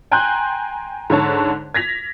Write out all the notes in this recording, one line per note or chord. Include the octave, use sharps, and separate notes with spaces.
G5 G#5 A#5 C6 F#6 G6
G#2 D3 C#5 A5
G#6 A#6 B6 F7